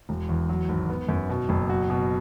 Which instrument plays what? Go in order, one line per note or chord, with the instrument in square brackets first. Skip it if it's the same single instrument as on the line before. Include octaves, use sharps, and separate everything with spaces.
[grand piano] E1
E2
F#3
G#1
B3
F#2
B2
F#1
F#4
B2